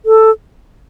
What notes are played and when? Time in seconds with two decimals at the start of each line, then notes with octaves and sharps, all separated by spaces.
0.06 A4